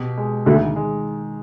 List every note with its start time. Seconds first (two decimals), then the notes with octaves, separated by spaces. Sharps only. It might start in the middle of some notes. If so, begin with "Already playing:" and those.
Already playing: B2 G4
0.18 G#3
0.46 D2 D3 D#3
0.76 G#3